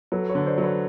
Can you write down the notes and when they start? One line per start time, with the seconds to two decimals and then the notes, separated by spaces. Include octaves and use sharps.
0.12 F#3 A4 B4
0.29 B4 C#5
0.35 D3
0.46 C5 D5
0.58 F#3
0.63 B4 C#5